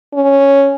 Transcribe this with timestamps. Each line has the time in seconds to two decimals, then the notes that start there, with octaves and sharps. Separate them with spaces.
0.14 C#4